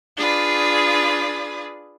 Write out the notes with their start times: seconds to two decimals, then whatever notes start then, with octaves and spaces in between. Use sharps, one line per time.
0.17 D4 F4 G#4 B4 D5